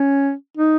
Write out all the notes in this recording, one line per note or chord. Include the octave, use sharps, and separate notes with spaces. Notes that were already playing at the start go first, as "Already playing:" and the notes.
Already playing: C#4
D#4